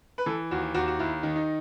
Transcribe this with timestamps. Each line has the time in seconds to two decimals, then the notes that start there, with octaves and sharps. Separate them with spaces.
0.18 B4
0.26 E3 A4
0.51 D#2 F#4
0.74 D#2 F#4
0.88 F#4
0.99 D#2 E4
1.23 D#3
1.36 D#4